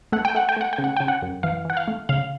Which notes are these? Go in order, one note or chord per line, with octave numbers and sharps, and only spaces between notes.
A3 F#5
G5
A3 F#5
G5
A3 F#5
G5
C#3
F#5
C#3 G5
F#5
F#2
E3 F5
E3 F#5
F5
A3
C#3 F5